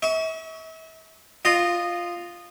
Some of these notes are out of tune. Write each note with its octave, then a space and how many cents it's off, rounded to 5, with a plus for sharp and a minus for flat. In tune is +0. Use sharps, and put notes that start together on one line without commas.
E5 -40 C#6 +25
F4 +0 D#5 -15